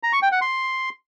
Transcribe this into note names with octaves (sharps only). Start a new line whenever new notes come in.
A#5
C#6
G5
F#5
C6